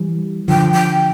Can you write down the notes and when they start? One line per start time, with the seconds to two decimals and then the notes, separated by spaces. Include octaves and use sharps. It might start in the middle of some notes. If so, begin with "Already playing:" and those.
Already playing: E3 G3
0.48 D3 F3 G5
0.74 G5